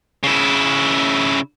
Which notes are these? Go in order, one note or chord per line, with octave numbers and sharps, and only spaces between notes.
C#3 E4